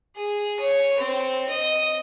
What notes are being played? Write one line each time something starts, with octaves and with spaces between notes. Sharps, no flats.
G#4
C#5
C4
D#5